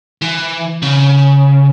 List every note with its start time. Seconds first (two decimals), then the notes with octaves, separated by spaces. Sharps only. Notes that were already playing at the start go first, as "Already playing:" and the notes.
0.22 E3
0.82 C#3